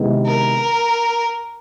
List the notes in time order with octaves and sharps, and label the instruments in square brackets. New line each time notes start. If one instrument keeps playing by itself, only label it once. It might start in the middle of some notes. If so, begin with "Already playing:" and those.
Already playing: [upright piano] C3 D#3 G#3 B3 E4
[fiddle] A#4